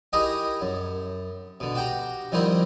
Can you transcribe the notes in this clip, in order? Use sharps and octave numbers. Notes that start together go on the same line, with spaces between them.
D#4 E4 G4 G#4 A#4 D#5
F#2
B2 D3
F#4 G4 G5 A#5
F2 D#3 G3 C4 D#4 E4